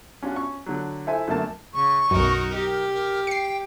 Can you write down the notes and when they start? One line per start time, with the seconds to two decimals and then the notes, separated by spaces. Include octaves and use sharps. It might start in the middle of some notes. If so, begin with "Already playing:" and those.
0.23 C#4 D4 F4 F#4
0.36 C#4 C#6
0.66 D3 F#3
1.07 E4 A4 C5 E5 G#5
1.28 F#2 D3 A3 A#3 A5
1.74 C#3 C#6
2.11 B1 F#2 D#4 F#4 A#4
2.55 G4 A#4
2.94 A#4
3.27 G5 C7 C#7